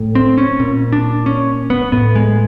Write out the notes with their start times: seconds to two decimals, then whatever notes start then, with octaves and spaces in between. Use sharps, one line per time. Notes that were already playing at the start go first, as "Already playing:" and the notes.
Already playing: A2
0.15 C4
0.38 C#4
0.60 A#2
0.93 D4
1.26 C#4
1.70 B3
1.92 A2 B3
2.15 G#3